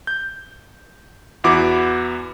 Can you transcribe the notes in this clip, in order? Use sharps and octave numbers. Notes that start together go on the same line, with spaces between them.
G6
E2 B3 E4 F#4 D6